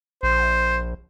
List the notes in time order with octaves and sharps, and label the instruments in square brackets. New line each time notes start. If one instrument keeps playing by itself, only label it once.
[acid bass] A#1 [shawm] C5